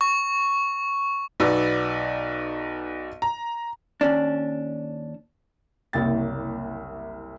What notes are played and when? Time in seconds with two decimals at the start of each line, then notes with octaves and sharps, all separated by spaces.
0.01 C#6
1.40 B1 D#4 F#4 B4 D5 E6
3.22 A#5
4.01 D#2 C#4 D4
5.93 F#1 C2 A#3 G5 A6